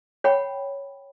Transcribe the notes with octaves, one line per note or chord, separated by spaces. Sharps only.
C#5 F#5 G5 B5